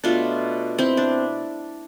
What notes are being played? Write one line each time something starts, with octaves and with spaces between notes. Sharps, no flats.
B2 A3 D4 F4
C4 E4
D4